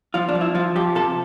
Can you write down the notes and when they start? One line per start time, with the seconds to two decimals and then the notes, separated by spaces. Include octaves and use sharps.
0.14 F3 F4
0.29 D4
0.35 F3
0.41 E4
0.55 F3 F4
0.76 F3 G4
0.95 C3 A4